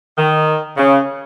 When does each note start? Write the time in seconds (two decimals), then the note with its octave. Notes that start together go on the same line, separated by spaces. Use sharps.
0.18 D#3
0.77 C#3